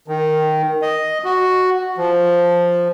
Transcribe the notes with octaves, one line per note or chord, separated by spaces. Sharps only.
D#3
D#5
F#4
F3